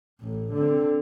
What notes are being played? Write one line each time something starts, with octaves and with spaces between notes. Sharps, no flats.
A1
D3 C4